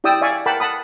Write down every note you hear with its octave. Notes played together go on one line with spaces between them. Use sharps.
E4 G4 D5 G5 D#6 E6
D5 E5 F5 G#5 C#6
A#4 F#5 G5 A5 B5 D6
F#5 A5 B5 D#6